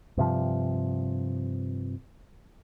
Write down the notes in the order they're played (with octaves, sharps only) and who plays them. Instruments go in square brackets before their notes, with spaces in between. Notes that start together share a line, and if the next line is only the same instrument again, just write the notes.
[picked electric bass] G2 C3 F3